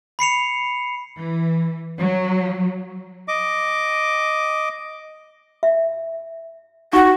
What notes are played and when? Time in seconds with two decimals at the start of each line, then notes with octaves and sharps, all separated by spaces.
0.19 B5 C7 C#7 F7
1.18 E3
2.02 F#3
3.28 D#5 D6
5.63 E5
6.93 D#4 F#4 F#5 C#6